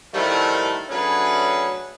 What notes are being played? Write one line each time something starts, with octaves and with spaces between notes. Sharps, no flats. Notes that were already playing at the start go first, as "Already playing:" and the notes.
A2 D#3 F3 G3 A3
F#3 A3 C#4 D4 G#4 B4